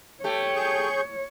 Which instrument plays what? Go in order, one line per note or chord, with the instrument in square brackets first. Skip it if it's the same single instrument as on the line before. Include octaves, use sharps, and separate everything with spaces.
[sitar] A3 G4 [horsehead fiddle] C#5
[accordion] G#4 C#6 G6